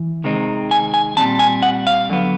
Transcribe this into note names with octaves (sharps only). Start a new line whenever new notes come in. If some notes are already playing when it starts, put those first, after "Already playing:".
Already playing: E3
C3 D#3 G#3 C4 D#4
G#5
G#5
A#2 G3 C4 A5
G#5
F#5
F5
D3 F#3 B3